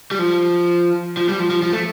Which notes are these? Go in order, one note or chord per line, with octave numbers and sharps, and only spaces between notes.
G3
F3
F3
G3
F3
F3
F3
A3